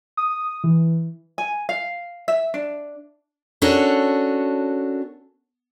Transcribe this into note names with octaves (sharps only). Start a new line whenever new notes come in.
D#6
E3
G#5
F5
E5
D4
C#4 D4 F#4 A4 A#4 C#5